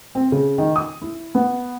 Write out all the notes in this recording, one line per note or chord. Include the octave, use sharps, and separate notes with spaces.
C4
C#3
D#3
D#6
E4
B3